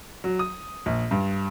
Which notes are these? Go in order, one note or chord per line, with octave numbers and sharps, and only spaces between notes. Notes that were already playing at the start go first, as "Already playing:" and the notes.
F#3
D#6
A#1
G2